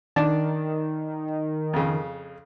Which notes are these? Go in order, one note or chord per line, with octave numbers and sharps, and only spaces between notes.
D#3 D4 D5 A5
F2 C#3